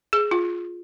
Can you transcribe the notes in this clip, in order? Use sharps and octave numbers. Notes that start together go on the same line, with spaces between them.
G#4
F4